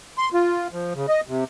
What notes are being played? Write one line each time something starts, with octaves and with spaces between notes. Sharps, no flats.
C6
F4
F3
C#3
D#5
C3